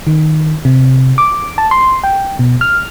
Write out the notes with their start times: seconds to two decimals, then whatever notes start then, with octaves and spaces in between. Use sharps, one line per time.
0.07 D#3
0.65 C3
1.18 D6
1.58 A5
1.71 C6
2.04 G5
2.39 B2
2.61 F6